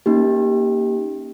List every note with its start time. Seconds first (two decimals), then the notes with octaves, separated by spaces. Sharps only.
0.06 A#3 C#4 D#4 G4